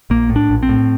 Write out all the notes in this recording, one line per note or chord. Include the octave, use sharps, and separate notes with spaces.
A#1 A#3
A2
D4
A#1
C4
A2